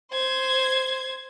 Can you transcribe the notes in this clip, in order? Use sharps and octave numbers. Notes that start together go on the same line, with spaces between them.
C5 G#6